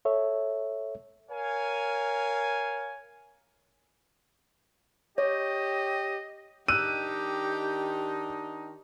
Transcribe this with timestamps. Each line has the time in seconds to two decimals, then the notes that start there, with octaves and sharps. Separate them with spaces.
0.05 A4 C#5 E5
1.31 A#4 C#5 F5 G#5
5.18 G4 C#5 D#5
6.68 D#3 D4 D#4 G4 E6 F#6 D#7